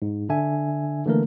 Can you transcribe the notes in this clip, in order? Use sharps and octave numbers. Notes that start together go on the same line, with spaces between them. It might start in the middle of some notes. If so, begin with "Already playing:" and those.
G#2
D3 D4 E5 G#5
D3 E3 A3 A#3 A#4